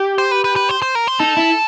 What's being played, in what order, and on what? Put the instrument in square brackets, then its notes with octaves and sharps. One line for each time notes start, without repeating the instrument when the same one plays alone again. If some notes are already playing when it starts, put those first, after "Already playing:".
Already playing: [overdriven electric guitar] G4
[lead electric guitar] C5
B4
B4
B4
C5
C5
A#4
C5
[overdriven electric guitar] D#4 [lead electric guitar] A4
[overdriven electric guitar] E4